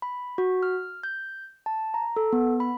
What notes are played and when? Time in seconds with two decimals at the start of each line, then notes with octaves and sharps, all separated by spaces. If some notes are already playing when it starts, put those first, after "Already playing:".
0.02 B5
0.38 F#4
0.63 F6
1.03 G6
1.66 A5
1.94 A#5
2.16 A4
2.33 B3
2.60 B5